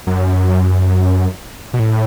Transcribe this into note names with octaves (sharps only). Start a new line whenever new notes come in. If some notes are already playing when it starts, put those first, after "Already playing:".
F#2
B2
A2